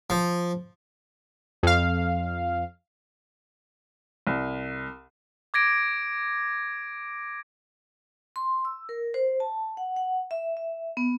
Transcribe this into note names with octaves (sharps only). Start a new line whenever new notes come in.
F3
F2 F5
C2
D6 G#6 A#6 D7
C6
E6
A#4
C5
A5
F#5
F#5
E5
E5
B3